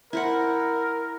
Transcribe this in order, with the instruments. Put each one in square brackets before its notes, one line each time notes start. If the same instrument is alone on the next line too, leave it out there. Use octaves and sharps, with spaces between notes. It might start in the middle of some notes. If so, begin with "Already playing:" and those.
[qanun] E4 C5 F#5 [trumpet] A#4